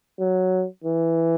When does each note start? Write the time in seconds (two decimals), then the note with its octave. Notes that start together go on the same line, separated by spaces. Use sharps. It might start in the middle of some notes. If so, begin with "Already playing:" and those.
0.20 F#3
0.84 E3